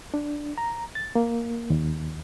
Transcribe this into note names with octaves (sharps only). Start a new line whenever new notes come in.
D4
A#5
A6
A#3
D#2